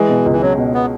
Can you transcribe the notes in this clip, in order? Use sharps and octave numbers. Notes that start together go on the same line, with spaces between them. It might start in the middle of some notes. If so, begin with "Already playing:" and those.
Already playing: E3 G#3
B2
C#2
E3
F#3 C#4
B2
B3